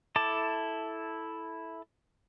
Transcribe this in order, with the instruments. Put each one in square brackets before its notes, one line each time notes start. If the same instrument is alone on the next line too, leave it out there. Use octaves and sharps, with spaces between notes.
[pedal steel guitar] E4 A4 A5 D6